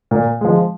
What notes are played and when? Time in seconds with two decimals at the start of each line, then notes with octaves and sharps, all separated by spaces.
0.11 A#2
0.41 F3 G#3